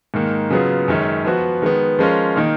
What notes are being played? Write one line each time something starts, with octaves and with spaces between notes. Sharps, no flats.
G#2 D#3 A#3
C#3 F#3 B3 F4 G#4
F#2 D#3 G#3 C#4
F3 B3 F#4
D#3 G#3 B3
F3 G#3 C#4 F4 A#4
D#3 A#3 D#4